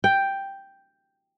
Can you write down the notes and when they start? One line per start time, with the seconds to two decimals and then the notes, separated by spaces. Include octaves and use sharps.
0.04 G5